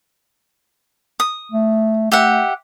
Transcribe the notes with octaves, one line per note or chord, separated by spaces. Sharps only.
D#6
A3
A3 G4 E5 F#5